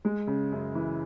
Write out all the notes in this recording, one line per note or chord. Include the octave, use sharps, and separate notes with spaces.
G#3
C#3
F#2
E3